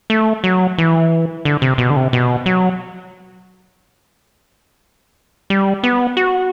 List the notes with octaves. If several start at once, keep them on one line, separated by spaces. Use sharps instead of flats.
A3
F#3
E3
D3
C3
B2
D3
C3
B2
F#3
G3
B3
F#4